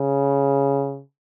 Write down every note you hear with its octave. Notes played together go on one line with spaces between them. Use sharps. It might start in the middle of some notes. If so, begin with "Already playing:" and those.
Already playing: C#3